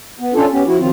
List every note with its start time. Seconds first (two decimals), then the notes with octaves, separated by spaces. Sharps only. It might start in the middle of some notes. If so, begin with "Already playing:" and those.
0.19 B3
0.34 C#4 D4 F4 A4
0.51 B3 C#4 G4
0.66 F3 E4 F#4
0.79 D#3 F3 F#3 C4 F4